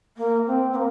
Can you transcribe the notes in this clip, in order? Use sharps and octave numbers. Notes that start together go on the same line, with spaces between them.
A#3
C4
C4
A#3